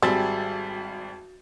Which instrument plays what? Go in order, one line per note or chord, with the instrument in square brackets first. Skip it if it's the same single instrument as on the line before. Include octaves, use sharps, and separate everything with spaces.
[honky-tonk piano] G#1 G3 A6 [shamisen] C4 [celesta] F#4 [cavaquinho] G#4 A4 E5